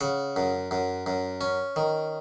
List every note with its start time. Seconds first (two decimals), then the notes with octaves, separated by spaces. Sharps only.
0.01 C#3 F#5
0.36 F#2
0.71 F#2
1.06 F#2
1.41 C#4
1.76 D#3